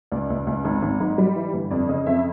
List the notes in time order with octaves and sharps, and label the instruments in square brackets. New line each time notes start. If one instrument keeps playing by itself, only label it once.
[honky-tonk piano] C#2 D5
C#2
C#2
G#1
G#1
G#2
G3
E3
G1
F2 D5
C#3 D#5
F2 E5